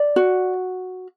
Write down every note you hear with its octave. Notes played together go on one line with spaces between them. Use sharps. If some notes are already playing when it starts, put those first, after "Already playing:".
Already playing: D5
F#4